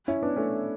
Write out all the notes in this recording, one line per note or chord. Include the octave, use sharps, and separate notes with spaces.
C#4 E4
B3 D4
A3 C#4